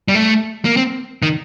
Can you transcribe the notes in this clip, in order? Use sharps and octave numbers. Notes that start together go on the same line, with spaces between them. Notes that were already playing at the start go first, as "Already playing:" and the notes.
G3
A3
A#3
C4
D#3